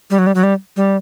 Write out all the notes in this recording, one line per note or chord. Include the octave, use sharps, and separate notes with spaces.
G3
F#3
G3
F#3
G3
G3